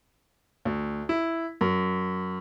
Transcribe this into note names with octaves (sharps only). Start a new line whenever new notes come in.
D2
E4
F#2